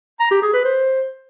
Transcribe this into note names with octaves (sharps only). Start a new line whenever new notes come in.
A#5
G4
G#4
B4
C5